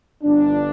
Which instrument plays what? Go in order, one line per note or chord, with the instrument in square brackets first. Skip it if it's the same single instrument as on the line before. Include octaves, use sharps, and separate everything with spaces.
[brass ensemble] G1 G2 F3 D4